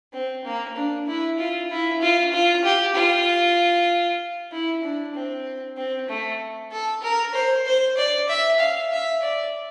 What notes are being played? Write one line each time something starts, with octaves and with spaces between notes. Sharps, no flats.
C4
A#3
D4
E4
F4
E4
F4
F4
G4
F4
E4
D4
C4
C4
A3
A4
A#4
C5
C5
D5
E5
F5
E5
D5